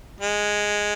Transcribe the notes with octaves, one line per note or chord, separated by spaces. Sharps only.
G#3